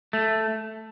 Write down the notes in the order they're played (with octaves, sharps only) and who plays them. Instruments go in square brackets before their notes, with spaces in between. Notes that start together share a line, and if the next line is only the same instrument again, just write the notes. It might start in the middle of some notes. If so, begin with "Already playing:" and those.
[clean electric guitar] A3